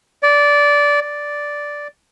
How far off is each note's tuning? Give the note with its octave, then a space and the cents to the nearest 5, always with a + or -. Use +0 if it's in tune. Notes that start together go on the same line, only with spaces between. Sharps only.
D5 -15
D5 -5